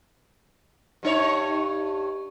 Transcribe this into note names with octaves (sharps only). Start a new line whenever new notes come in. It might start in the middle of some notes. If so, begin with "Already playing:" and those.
G2 D#4 C#5